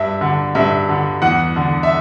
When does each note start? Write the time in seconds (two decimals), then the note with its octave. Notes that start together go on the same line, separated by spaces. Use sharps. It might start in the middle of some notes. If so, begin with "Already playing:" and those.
Already playing: G2 E5
0.21 D3
0.55 G2 E5
0.89 D3
1.22 E2 F#5
1.56 D3
1.83 E5